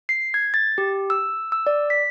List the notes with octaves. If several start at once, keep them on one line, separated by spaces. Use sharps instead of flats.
C7
G#6
A6
G4
E6
E6
D5
B6